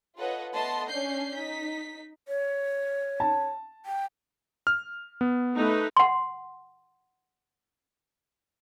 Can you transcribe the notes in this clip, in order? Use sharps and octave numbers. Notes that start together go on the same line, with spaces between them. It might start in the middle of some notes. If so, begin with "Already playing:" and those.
F4 A4 B4 C#5 D#5 F#5
A3 B3 D#5 A5 C6
C#4 D4 G6 C7
D#4 B6
C#5
A5
G5
F6
B3
A3 D#4 B4
F#5 C6